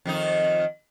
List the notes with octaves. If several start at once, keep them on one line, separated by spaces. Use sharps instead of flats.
F2 D#3 D#4